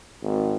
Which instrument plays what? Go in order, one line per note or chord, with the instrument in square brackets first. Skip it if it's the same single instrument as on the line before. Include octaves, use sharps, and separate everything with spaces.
[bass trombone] G#1